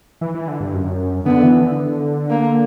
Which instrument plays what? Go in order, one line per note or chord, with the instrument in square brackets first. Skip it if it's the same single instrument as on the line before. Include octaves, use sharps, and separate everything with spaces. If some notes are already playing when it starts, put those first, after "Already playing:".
[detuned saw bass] E3
E3
D3
G2
F#2
[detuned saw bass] D3 [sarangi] B3
[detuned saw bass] E3
D3
[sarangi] A#3